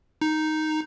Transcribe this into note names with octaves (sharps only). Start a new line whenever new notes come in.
D#4